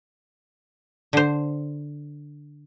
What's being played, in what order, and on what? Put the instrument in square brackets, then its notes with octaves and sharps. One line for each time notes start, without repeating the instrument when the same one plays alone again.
[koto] D3 C5